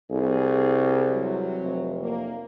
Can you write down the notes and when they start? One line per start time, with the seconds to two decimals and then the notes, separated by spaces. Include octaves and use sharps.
0.11 C2 G#4
1.10 C3 E3 F#3
1.61 F1
2.02 A#3